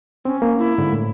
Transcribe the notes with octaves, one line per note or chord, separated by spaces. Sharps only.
C4 C#4
A#3
E4
G#2 D3
A2